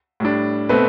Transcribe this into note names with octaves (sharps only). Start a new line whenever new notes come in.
A2 G3 D4
B2 A3 C4 B4